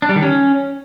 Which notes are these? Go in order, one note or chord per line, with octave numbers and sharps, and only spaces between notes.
D4
G3
D#3
C#4